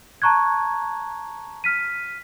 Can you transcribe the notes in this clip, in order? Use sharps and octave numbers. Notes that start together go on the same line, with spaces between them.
A5 A#5 C#6 F#6 G#6
F6 B6 D#7